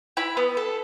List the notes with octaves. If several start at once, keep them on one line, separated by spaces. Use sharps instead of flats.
E4 B5
B3
A4